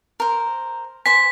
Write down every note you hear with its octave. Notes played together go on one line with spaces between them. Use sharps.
A#4 C5
C5 G#5 B6